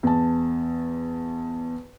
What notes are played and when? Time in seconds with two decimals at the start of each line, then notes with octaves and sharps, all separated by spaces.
0.03 E2 A5